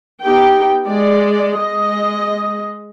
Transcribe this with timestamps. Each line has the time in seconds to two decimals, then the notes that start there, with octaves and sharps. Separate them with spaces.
0.22 B3 D#4 G4 G5
0.87 G#3 D5
1.56 G#3 D#5